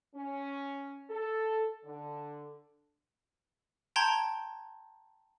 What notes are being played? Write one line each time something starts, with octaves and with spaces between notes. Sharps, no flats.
C#4
A4
D3
G5 A5 A#5 C6 G6 G#6